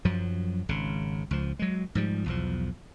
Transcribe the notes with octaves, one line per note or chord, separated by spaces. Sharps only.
F#2 F3 F#3
G#1 C#3
C#2 F3
F#3 G#3
G#2 F3 G3
B1 E2 F3